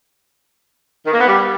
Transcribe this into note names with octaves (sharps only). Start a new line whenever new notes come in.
D#3
A#3
B3
G3